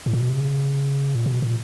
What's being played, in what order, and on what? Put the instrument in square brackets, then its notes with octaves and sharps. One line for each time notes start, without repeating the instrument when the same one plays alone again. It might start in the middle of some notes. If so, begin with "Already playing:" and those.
[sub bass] A2
A#2
B2
C3
C#3
A#2
B2
A#2